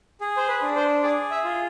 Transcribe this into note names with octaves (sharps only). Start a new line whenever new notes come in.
G#4
C5
B4
D4
C5
G#4 D5
E5
F4